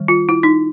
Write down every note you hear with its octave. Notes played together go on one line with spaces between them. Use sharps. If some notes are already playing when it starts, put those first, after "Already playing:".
Already playing: D#3 G3
F4
E4
D#4